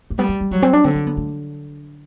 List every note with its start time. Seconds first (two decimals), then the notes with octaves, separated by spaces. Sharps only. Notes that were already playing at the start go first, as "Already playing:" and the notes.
0.10 A3
0.18 G3 B3
0.29 G3
0.41 G3
0.51 F#3 G3
0.62 C4
0.73 D4
0.84 D3 C4
0.95 C4
1.06 B3
1.17 A3